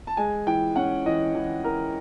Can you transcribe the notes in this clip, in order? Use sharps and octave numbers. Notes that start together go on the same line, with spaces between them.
A5
G#3 G#5
E3 G5
C#4 F#5
E3 D#5
E3
E3 A#4